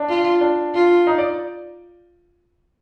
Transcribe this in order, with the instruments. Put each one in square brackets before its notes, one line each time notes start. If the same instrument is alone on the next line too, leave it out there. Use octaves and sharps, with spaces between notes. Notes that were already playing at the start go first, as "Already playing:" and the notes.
Already playing: [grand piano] D4
[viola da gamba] F4
[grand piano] D4
[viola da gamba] F4
[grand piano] D#4
D5